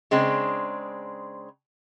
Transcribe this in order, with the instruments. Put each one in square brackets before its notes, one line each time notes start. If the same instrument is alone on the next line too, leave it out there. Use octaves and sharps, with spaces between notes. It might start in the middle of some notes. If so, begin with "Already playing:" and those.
[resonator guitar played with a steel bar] C#3 G#3 C4 D4